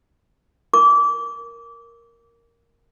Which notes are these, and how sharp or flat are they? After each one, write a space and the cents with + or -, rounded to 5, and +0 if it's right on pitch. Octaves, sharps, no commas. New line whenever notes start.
A#4 +0 D6 -25